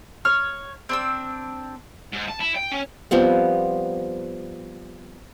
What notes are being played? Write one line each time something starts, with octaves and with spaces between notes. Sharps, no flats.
C#5 F6
C4 D4 E6
G#2
A5
E4
G5
C#4
F3 G3 B3 C4